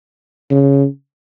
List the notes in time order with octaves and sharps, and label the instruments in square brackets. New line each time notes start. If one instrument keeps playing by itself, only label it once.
[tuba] C#3